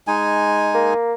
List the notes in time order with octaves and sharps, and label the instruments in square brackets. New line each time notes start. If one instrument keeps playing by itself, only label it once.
[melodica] G#3 D#4 G#5
[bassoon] A#3